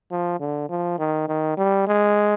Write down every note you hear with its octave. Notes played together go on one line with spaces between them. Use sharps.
F3
D3
F3
D#3
D#3
G3
G#3